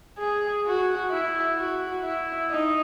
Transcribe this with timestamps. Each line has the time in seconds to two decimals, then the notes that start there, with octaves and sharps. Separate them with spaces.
0.19 G#4
0.66 F#4
1.11 E4
1.59 F#4
2.04 E4
2.51 D#4